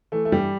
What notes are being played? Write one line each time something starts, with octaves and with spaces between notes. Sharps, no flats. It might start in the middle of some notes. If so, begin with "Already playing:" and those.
E3 A3
A3
G2 G3